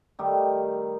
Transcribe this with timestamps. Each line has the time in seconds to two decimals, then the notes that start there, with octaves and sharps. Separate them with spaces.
0.19 D#3 G3 A3 G4